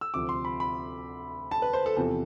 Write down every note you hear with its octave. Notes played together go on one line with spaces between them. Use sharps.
E6
D2 C3 F3 D6
C6
B5
B5
A5
B4
C5
A4
E2 C3 F3 A4